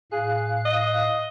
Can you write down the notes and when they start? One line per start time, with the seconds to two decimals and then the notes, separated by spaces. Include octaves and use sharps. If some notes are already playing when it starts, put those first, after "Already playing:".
0.12 A2 G#4 F5 F#6
0.65 D#5